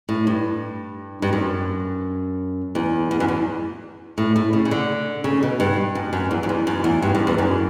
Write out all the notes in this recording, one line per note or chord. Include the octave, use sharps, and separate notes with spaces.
A2
G2
G2
F#2
E2
E2
F#2
E2
A2
A2
C#3
C#3
D3
C#3
B2
G2
F#2
F#2
E2
F#2
E2
F#2
E2
G2
F#2
E2
F#2